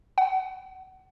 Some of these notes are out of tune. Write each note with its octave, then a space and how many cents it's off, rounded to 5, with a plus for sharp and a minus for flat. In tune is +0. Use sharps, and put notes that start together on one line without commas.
F#5 +30